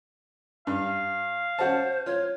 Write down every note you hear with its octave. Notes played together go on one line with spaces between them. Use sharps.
G2 F5
C#4 F#4 C5 A5
F4 C#5